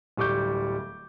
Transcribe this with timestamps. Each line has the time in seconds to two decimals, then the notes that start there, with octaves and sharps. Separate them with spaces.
0.17 D1 G3 C#6 D6 G6